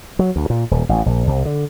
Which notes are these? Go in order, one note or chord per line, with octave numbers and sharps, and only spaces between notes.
F#3
D2
A#2
D#1
A1
A#1
C2
D3